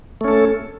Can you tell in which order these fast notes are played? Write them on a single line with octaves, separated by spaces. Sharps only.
A3 C#4 A4